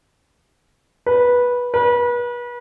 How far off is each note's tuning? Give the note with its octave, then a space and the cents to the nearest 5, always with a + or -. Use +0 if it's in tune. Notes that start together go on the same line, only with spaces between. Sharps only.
B4 -15
B4 -35